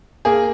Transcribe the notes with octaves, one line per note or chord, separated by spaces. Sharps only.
A#3 G#4